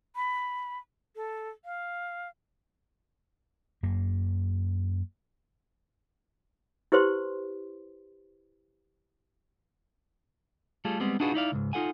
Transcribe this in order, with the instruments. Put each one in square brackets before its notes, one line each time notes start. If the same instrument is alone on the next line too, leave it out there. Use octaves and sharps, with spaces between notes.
[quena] B5
A4
F5
[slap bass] F#2 A#3
[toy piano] E4 G4 B4 C5 C6
[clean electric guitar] G3 A3 F4 G#4 A4
G3 G#3 B3 C4
D4 D#4 F4 F#4 G#4 B4
D#4 E4 D5 F5
C#2 G#2
D#4 F4 A4 F#5 G#5